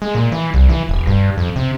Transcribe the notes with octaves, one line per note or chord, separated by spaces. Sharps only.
G#3
A#2
E3
C2
E3
E1
G2
F2
C3